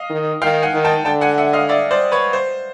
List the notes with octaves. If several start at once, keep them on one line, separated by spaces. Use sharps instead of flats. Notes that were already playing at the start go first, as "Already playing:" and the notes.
Already playing: D#5 F5
D#3
D#3 F5 G5
F#5 G#5
D#3
G5 A5
D3 G5 A5
F#5 G#5
E5 F#5
D#5 F5
D5 E5
C5 D5
B4 C#5
C5